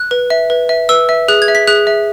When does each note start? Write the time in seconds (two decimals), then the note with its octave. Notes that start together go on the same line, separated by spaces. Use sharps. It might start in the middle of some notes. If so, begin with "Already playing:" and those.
Already playing: F#6
0.11 B4
0.30 E5
0.50 B4
0.69 E5
0.89 B4 E6
1.09 E5
1.28 G#4 F#6
1.42 G#6
1.48 E5
1.55 B6
1.67 G#4 F#6
1.87 E5